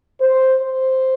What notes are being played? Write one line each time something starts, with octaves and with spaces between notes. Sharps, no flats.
C5
C5